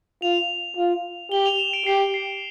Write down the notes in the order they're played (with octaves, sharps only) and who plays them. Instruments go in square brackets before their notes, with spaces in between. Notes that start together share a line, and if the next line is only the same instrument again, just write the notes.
[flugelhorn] F4 [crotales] F7
[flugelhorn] F4
[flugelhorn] G4 [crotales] G7
[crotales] F7
E7
D7
[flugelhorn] G4 [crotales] C7
[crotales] C7